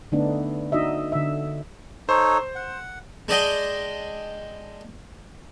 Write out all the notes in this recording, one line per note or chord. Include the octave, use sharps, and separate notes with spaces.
D3 A3 B3 D4 D#4
D4 D#4 F#4 D#5 E5
D3 E5
D#4 A4 C5 C#5
F#5
G#3 D4 D5 D#5 G5